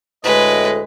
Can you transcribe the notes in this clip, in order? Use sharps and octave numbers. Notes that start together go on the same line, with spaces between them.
D2 A2 G#3 B4 D#5